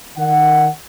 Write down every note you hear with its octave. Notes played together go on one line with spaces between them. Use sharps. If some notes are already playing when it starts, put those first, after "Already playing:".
D#3 F#5